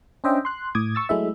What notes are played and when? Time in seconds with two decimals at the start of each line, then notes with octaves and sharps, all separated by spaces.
0.24 C#4 D4 C5 D#5 E5 G5
0.45 C6 F#6
0.75 A2 D6 D#6 G#6
0.95 C#6 E6 A6
1.09 F#3 G#3 A3 E4 E5